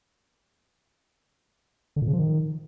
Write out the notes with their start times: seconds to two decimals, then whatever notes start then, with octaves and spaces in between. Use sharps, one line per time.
1.96 D3
2.02 A#2
2.08 C#3
2.13 F3
2.19 D#3